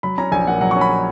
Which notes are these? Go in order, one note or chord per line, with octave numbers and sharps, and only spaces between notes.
F#3 B5
C#4 A#5
A#1 G#5
A#2 F#5
F#3 F#5
C#4 C#6
B5